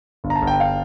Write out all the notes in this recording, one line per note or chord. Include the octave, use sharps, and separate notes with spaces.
G1
A#5
A5
G1
G5
F5